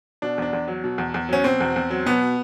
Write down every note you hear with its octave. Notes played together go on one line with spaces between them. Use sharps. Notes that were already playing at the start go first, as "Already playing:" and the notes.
B2 D4
E2 D4
E2
F#3
B2
E2
E2
F#3 C#4
B2 C4
E2
E2
F#3
B2 B3